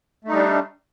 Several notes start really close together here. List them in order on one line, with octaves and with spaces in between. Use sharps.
A3 D#4 G3 D4